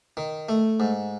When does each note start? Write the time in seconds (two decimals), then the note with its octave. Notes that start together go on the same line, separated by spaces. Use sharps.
0.17 D#3
0.49 A3
0.80 G#2